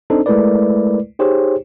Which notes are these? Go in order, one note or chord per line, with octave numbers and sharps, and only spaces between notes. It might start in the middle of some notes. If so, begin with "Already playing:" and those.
C4 D4 D#4 A4 C5
G#3 A3 E4 A#4 B4 D5
D#4 G4 G#4 C5 C#5